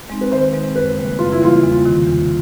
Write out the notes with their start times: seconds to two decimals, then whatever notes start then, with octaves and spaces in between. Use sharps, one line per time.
0.10 G#3 C4 D#4
0.21 B4
0.32 D#3 C5
0.54 G#3 C4 D#4
0.75 F#2 B4
0.97 C#3 E3 G3 A#3
1.19 F#2 F4
1.32 E4
1.41 C#3 E3 G3 A#3 F4
1.63 E2
1.85 C3 D#3
2.07 E2